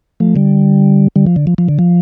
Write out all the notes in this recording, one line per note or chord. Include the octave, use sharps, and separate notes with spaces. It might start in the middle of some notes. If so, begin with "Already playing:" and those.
F3 A3
D3 G3
D3 G3
F3
D3
F3
F3
D3
F3